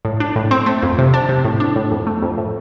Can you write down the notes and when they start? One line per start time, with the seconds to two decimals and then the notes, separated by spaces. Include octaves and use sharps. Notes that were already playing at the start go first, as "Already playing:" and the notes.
0.05 A2
0.20 D4
0.36 A2
0.51 C4
0.66 A3
0.82 F2
0.98 C3
1.14 D4
1.29 C3
1.45 A2
1.60 D4
1.76 A2
1.91 F2
2.07 A3
2.22 F2
2.38 A2